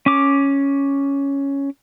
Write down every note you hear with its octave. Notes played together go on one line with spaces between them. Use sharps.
C#4 D6